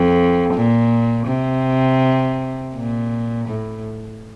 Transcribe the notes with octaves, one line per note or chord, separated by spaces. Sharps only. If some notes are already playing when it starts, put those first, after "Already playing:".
Already playing: F2
A#2
C3
A#2
A2